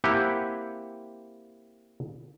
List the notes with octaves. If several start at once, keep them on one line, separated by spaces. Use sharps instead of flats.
A#3 C4 E4 G4 F#5 G#5